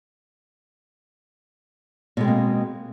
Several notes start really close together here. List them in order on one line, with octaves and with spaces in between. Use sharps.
B2 G#3 C4 A#3